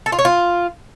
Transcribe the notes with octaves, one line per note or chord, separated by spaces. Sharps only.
A4
F4
C#5
F4